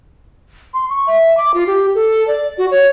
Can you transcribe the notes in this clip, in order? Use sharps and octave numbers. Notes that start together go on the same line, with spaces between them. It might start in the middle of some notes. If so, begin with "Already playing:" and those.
C6
C#6
E5
D6
F4
G4
A4
D5
F#4
C#5